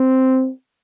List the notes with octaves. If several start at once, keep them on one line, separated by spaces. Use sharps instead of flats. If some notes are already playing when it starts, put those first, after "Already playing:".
Already playing: C4